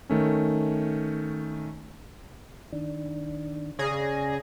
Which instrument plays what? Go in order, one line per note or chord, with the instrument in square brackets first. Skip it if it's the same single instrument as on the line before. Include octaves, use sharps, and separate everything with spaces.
[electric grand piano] D#3 A3 C#4
[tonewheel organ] D#3 D4
[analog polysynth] C#3 G#4 [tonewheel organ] D5 A#6